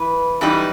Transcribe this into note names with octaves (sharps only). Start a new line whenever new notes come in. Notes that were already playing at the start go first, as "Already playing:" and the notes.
Already playing: E3 B4
F#2 E3 G3 D#4